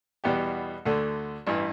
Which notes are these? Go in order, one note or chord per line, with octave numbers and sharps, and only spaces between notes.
E2 B2 G3 B3 G4
D2 D3 A3
A1 G2 E3